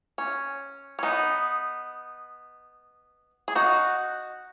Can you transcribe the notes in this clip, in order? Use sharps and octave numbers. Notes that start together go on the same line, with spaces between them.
C#4
C#4
B3 D#4
G#4
D#4 F#4